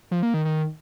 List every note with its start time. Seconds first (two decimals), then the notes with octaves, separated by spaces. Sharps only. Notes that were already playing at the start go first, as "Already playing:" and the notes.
0.11 F3
0.23 A#3
0.34 D#3
0.45 D#3